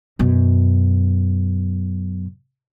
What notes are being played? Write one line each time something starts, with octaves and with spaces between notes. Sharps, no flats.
F#2 B2